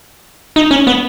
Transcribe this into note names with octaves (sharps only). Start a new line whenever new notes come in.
D#4
C#4
B3